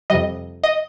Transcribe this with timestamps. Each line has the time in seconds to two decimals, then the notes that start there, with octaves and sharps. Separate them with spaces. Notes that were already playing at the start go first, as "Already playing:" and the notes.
0.10 F2 C3 G3 D#5
0.64 D#5